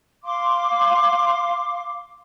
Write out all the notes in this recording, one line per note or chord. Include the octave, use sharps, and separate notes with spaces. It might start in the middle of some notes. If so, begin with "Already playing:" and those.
F5 C6 D6